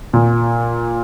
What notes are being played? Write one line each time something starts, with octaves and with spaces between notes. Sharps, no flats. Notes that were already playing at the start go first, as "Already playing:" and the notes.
A#2